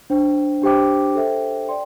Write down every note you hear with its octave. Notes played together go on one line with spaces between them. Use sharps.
D4 C5 G5
D4 G4 C5 G5 D6
A4 C5 E5 G5
D5 G5 C6